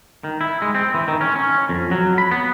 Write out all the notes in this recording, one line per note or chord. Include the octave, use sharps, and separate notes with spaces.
D#3
E4
G#3
C4
E3
D#3
C#4
C#4
F2
F#3
B5
B3